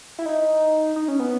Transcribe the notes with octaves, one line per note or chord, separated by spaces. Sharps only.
E4
D#4
D#4
C#4
B3